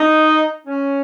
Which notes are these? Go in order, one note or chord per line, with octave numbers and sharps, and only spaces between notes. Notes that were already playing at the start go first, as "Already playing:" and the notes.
Already playing: D#4
C#4